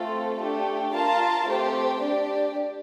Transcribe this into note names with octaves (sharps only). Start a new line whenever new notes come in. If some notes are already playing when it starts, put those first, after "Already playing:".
Already playing: A3 C4 F4 A4
A3 D4 G4
F4 A#4 F5 A5
A3 C4 G4 C5
D4 G4 D5